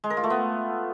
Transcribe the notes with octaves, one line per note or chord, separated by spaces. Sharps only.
G#3
A#4
F4
A3
B3